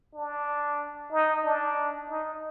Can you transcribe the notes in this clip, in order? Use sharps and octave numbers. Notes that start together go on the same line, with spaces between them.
D4
D#4
D4
D#4